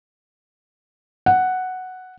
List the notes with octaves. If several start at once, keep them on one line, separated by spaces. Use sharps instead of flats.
F#5